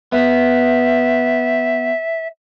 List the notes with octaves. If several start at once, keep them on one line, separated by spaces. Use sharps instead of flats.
B3 E5